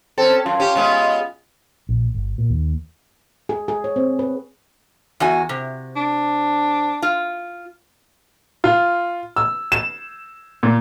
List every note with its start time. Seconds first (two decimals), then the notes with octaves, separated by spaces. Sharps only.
0.18 C4 C#4 A4
0.46 F#2 F4
0.60 C#4 G4
0.75 G#3 B3 C#4
1.89 A#1
2.15 G1
2.38 A#2
2.50 D#2
3.49 G#4
3.68 G#4
3.84 C#5
3.96 C4
4.19 B4
5.20 E2 F#4 G#5
5.49 C3
5.96 D4
7.02 F4
8.64 F4
9.36 E6
9.72 E7
10.63 A#2